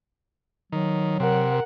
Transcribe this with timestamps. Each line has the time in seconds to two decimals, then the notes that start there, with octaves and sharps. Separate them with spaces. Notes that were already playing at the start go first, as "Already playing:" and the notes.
0.72 D#3 F#3
1.20 C3 A#4 F#5